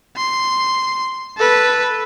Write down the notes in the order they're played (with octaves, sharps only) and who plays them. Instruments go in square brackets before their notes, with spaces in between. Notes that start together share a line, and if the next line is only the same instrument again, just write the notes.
[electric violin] C6
A4 B4